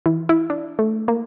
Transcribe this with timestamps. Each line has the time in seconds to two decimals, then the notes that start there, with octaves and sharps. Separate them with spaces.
0.06 E3
0.29 E4
0.50 D4
0.79 A3
1.08 A#3